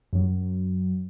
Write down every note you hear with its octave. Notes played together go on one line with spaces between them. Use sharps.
F#2 F#3